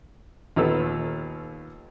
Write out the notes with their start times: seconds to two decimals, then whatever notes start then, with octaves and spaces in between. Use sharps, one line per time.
0.56 D#2 A#2 D#3 B3 A4 E6